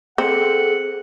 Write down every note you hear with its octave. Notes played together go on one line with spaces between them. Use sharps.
C4 G#4 A4 F#5